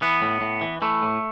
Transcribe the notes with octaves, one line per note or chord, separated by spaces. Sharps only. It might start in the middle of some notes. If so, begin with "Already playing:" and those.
E3 B3
A2
A2
E3
E3 A3
A2